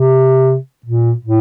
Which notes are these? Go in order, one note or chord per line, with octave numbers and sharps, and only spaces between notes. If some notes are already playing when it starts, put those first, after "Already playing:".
Already playing: C3
A#2
A2